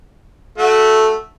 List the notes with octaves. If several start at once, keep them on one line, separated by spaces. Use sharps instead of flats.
A3 F#4